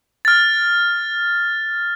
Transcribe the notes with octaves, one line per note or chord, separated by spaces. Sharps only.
F6 A6